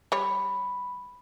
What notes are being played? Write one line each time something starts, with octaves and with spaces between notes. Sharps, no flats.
G3 C#5 B5